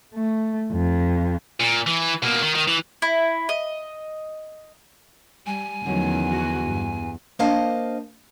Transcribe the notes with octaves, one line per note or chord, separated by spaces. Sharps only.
A3
F2
A#2
E3
B2 A#3
D#3
D#3
E3
E4
D#5
G3 G#5
E2 D3 D#3 F3 F#3 A3 C#4
F#4
G2
A#3 D4 C5 D#5 F5 A5